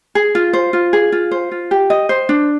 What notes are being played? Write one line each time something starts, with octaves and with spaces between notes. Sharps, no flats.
G#4
F4
C5
F4
G#4
F4
C5
F4
G4
D#5
C5
D4